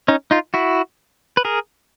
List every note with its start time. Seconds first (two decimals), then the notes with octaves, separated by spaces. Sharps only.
0.08 C#4 D#4
0.31 D#4 F4
0.54 E4 F#4
1.37 B4
1.45 G#4 A#4